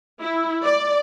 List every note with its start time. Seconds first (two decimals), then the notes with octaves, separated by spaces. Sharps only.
0.20 E4
0.63 D5